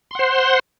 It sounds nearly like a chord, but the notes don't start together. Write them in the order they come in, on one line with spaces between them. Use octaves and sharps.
C6 F#5 C5